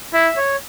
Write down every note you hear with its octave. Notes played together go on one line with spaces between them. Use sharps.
E4 E5
C#5